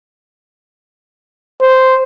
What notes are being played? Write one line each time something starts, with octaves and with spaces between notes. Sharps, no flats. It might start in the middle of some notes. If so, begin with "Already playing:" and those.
C5